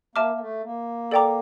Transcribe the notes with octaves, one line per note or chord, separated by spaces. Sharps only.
A#3 E5 A5 D6 F6
A#3
A3
A#3
A4 D5 G5 A#5 D6